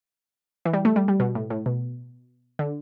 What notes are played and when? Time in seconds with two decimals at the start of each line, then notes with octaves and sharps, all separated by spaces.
0.65 E3
0.73 G3
0.85 A3
0.96 G3
1.08 G3
1.20 B2
1.35 A2
1.50 A2
1.66 B2
2.59 D3